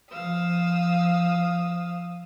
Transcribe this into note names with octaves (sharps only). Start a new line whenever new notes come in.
F3 F5 D#6 E6